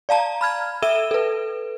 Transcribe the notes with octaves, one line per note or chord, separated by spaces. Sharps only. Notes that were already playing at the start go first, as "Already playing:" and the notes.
D5 F5 A5 A#5
B5 F6 G#6
A4 E5 E6 D#7 E7 G7
A4 B4